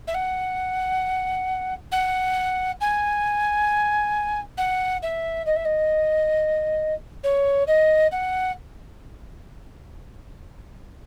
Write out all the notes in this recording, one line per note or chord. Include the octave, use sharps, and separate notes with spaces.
E5
F#5
F#5
G#5
F#5
E5
D#5
E5
D#5
C#5
D#5
F#5